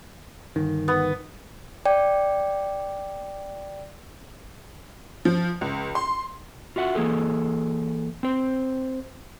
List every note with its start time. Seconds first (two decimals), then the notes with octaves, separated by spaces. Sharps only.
0.56 G1 D#3
0.88 B3
1.85 D5 G5
5.25 F3
5.61 C#2
5.95 C6
6.76 F4 F#4 E5 F#5
6.95 E3 A#3 G#4 A4
8.23 C4 C5